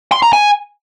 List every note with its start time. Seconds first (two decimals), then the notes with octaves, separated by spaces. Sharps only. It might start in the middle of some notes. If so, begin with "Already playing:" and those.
0.12 C6
0.23 A#5
0.33 G#5